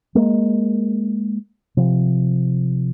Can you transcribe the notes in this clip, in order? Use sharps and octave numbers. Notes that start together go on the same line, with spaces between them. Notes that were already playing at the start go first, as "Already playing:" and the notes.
G#3 A#3
C3 F3